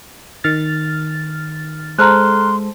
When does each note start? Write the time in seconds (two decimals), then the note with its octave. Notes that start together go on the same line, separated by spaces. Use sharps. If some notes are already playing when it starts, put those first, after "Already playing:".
0.44 D#3 F6 A6
1.99 G#3 A4 C5 A#5 C6 F6 F#6